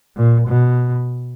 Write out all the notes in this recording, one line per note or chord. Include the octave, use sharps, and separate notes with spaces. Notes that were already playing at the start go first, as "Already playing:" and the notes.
A#2
B2